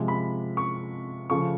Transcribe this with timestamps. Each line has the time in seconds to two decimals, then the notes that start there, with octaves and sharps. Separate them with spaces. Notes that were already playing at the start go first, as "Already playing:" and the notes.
Already playing: C3 F3 G#3
0.08 B5
0.57 C#6
1.30 C#3 F3 A3 C#6